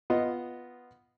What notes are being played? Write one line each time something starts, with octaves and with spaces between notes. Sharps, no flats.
B3 F4 D#5